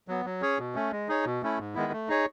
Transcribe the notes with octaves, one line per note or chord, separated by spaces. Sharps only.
F#3 B3
F#3
C#4 G#4 C#5
B2
A3 C#4
G#3
D#4 G#4 C#5
B2
A3 C#4 E4
G#2
D#3 G#3 B3 E4
A3
D#4 G#4 C#5